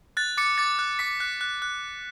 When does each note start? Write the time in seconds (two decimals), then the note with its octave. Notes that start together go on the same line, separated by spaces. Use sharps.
0.17 F#6 A6
0.38 D6 A6 C#7
0.58 D6 A6
0.79 F#6
0.99 D6 B6
1.20 F#6
1.41 F#6
1.62 F#6